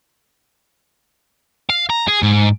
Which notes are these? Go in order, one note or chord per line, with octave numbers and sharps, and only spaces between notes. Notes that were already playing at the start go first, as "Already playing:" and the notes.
F5
A#5
G#4
G#2